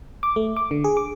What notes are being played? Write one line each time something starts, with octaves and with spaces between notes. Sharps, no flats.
D6
A3
D6
D3
G#4
D6